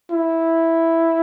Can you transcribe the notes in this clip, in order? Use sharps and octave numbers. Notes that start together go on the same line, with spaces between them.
E4